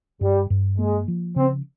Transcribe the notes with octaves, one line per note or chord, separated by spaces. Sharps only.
G2 G3
G2
G#3 A#3
F3
C#3 C4